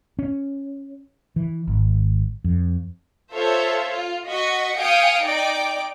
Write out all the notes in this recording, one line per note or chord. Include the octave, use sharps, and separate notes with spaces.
C#4
E3
G#1
F2
F4 A4 C5 C#5 E5
F4
F#4 D#5 F#5 C#6 B6
F5 G5 G#5 D#6 C#7 D7
D#4 D5 G5 D6